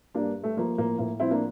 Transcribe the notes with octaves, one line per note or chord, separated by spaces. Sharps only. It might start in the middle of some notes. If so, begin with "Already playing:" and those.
G2 A#3 D4
G2
A3
F3 A#3
A2 A#3
A2 A#3
F3 C4 E4
A#3 D4